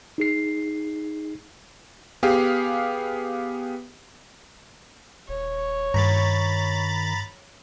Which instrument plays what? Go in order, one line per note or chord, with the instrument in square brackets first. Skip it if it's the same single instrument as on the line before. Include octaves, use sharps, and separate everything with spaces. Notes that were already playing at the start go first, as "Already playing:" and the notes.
[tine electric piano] D#4 G#4 C7
[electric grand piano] B3 G4 G#4 F5
[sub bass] D#1 [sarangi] C#5
[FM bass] G2 [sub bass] D#3 [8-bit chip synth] A#5 B5 A6